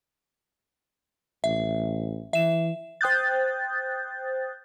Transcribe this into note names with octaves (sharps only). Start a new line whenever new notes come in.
A1 E5
E3 E5 E7
C5 G5 D#6 F#6 G6 A6